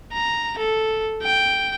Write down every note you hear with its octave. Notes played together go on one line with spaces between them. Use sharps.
A#5
A4
G5